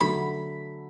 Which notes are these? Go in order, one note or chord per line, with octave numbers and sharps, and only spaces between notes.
D3 F#3 A3 B5